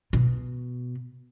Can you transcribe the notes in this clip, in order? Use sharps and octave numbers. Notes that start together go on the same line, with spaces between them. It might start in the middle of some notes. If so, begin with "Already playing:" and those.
B2